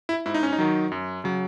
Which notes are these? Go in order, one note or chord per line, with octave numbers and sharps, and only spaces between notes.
E4
G#2 E4
D#4
C#4
D#4
D#3 F#3
F#2
C#3 F#3